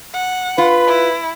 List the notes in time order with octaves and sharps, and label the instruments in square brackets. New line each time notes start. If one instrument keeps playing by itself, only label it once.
[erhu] F#5
[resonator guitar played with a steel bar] F4 [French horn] B4 [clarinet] B5
[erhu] E4